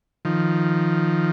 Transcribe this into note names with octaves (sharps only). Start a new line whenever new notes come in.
D#3 F3